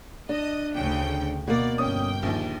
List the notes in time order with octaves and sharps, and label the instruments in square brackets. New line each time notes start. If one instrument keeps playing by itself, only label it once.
[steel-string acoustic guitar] D4 [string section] D#5
[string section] D2 C#3 G5
[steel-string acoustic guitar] B2 A#3 [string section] D5
[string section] G1 G5 [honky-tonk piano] C#4 D#6
[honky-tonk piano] A#1 D#2